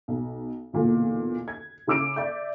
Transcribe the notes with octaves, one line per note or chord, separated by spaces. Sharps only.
B1
B1 E2 A#2 D3
G#6
C#3 E4 D6 E6 D7
D5 E5 G6